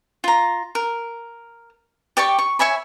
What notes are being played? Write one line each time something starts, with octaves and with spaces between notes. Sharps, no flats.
F4 A#5
A#4
G4 D5 G5 C#6
C#6
C#5 E5 G#5 B5